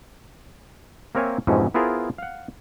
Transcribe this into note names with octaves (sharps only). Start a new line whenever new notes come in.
A#3 C4 A#4 C#5 E5 G#5
F2 G#2 B2 E3 F3 C#4
B3 E4 F4 G#4 A#4 C5
F5 F#5